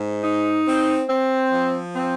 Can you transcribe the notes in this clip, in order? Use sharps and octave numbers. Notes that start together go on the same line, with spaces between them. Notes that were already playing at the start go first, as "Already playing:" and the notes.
Already playing: G#2
D#4
C4
C4
F3
C4